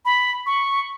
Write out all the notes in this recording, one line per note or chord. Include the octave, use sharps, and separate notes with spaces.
B5
C#6